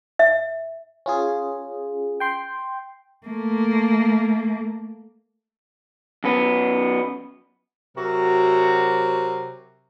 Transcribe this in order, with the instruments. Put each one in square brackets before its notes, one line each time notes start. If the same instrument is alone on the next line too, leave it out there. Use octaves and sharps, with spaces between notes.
[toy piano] E5
[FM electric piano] C#4 F4 G#4
G5 C6
[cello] A3 A#3
[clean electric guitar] F#2 B3
[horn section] C3 F#3 F#4 A#4